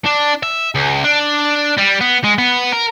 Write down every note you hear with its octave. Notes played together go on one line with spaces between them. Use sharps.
D4
E5
C#2
D4
G3
B3
G#3
B3
A#4